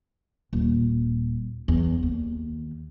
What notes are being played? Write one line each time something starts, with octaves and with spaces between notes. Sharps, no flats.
D#1
E2
D#2